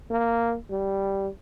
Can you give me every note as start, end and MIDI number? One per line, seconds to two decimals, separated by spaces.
0.10 0.55 58
0.70 1.28 55